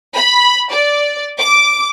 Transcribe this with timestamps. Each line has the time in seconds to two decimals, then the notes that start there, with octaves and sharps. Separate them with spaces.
0.14 B5
0.71 D5
1.39 D6